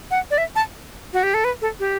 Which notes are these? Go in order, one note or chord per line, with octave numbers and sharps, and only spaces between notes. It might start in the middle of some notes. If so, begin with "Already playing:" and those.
F#5
D5
E5
A5
F#4
G4
A4
B4
A4
G4